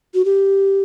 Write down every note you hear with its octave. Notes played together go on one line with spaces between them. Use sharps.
F#4
G4